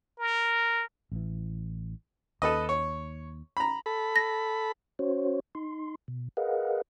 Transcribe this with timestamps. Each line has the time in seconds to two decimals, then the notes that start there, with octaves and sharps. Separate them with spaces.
0.19 A#4
1.12 A1 E3
2.42 D#2 A4 B4 D#5
2.69 C#5
3.57 A#5 B5
3.86 A4 B5
4.16 A#6
4.99 C#4 F#4 C5 C#5
5.55 D#4 C6
6.08 B2
6.37 G#4 A#4 B4 D#5 F5 F#5